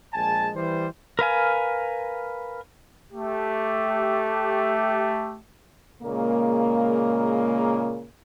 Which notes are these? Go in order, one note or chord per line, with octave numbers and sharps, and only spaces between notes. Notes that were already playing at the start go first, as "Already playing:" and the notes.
A#1 G#3 G#5 A5
E3 G3 C5
A#4 B4 F5 G#5
A3 G4
A#2 C#3 G#3 A#3